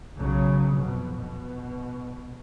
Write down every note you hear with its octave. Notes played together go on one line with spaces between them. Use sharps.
B1 C#3 F#3
B1 F2 B2
B2